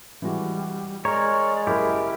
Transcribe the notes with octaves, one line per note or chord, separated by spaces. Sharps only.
E3 G3 G#3 F#4
G#3 A#4 C#5 D5 A#5
F#1 E4 G4 A#4 B5